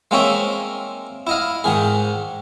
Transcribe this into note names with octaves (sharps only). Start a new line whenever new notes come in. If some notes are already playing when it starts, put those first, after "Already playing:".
G#3 A#3 C4 D#4 C#5 E5
E4 D#5 F5
G#2 D#3 G#4